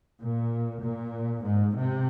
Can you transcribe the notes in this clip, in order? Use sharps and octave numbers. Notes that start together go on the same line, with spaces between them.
A#2
A#2
G#2
C3